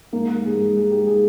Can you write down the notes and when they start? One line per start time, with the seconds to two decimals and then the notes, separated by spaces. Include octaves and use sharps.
0.13 G#2 A#3 A#4
0.34 G3
0.45 G#4
0.56 G#2
0.76 G3 G#4
0.91 G4
0.97 G#2
1.07 G#4